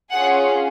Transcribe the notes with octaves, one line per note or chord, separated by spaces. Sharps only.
C#4 F4 G#4 F#5